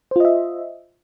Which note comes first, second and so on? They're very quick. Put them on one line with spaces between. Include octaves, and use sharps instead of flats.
C5 F4 D#5 E5